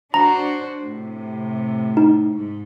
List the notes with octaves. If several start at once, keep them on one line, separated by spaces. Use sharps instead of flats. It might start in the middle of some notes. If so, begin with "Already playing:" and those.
D4 F#4 C5 A#5
A2 C3
D#4
G#2